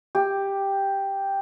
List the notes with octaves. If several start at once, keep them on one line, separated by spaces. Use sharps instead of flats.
G4